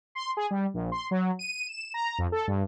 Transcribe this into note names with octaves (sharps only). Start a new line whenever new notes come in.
C6
G#4
G3
A#1
C6
F#3
D#7
E7
A#5
F2
A4
G2